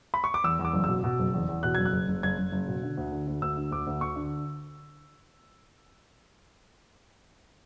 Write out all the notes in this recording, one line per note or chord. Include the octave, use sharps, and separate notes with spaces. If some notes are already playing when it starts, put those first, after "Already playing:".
B5
C#6
D6
E2 E6
E2
D6
F#1
B2 E6
B2
F#1
E2
E2
B2 F#6
F#1 G#6
F#6
F#1
F#1
F#1 G#6
F#1
F#1
B2
D3
D2
D3
D2
D2 E6
D3
D2 D6
D2
D2 C#6
D3